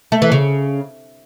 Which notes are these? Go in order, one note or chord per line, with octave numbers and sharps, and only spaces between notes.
A3
E3
C#3